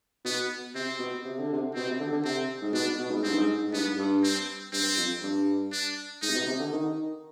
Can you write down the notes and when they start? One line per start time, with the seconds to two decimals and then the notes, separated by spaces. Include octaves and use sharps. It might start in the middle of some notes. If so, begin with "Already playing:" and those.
0.25 B2 B3
0.75 C3 C4
0.99 B2
1.25 C3
1.39 D3
1.53 C3
1.74 B2 C4
1.87 C3
2.00 D3
2.12 D3
2.24 C3 C4
2.62 G#2
2.73 B2 D4
2.99 B2
3.11 G#2
3.23 G2 C4
3.35 G#2
3.67 G#2
3.73 G2 B3
3.98 G2
4.24 C4
4.73 G2 C4
4.97 F2
5.22 G2
5.72 D4
6.22 G#2 D#4
6.30 C3
6.34 B2
6.47 C3
6.60 D3
6.72 D#3